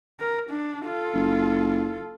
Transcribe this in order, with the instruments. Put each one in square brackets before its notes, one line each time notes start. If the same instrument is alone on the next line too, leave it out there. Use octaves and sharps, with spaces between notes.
[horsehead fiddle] A#4
D4
F4 A4
[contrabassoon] F#1